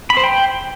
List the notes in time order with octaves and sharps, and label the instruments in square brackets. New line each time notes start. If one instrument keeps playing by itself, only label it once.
[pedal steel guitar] B5
C5
G5